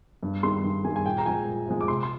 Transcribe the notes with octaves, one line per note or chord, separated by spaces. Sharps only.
G2
D#3 G3 C6
G2
D#3 G3 G#5
G#5
A#2 G5
A#5
F3 G#3 G#5
A#2
F3 G#3
D6
C3 C6
C6